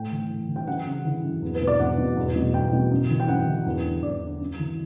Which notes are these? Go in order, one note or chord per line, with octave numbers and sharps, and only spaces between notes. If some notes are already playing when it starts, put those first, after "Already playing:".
Already playing: A2 G5
E3
A2
E3
G5
F#2 F#5
C#3
E3
F#2
E2
B4
B2
D5
E2 F#5
B2
E2
B2
E2 G5
B2
F#2
E3
G5
F#2 F#5
E3
E2
D3
E2 D5
D3
F#2
E3